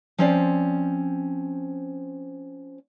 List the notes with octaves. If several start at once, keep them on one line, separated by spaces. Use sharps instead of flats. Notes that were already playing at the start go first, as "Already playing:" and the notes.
F3 C4 C#4 C5 D5